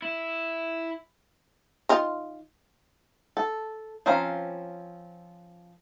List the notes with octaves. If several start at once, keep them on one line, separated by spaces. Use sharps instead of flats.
E4
D#3 F4
A4
F3 C4 C#4 F5 A#5